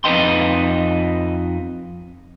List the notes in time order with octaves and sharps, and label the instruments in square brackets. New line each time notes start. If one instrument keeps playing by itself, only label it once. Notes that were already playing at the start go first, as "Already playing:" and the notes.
[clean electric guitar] F2 D#4 B4 D#5 G5 C6